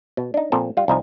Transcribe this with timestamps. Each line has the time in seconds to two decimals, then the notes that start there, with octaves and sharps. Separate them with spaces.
0.17 B2
0.34 D4 D#4
0.52 A#2 F3 C4 A4
0.77 G3 F4
0.88 C2 F3 D#4 G#5